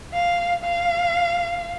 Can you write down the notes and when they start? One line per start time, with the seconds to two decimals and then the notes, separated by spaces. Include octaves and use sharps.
0.13 F5
0.64 F5